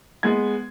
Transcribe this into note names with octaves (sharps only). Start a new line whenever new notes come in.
G#3 B3 G#6